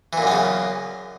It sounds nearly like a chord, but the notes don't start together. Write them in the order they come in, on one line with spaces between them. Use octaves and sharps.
E3 A#2 F#2 B3 C#3